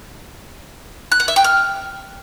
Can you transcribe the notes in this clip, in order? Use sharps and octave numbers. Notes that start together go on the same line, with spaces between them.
F#6
F#5
E5
G5
F6